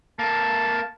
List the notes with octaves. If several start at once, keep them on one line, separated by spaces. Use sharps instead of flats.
A#3 A4 A5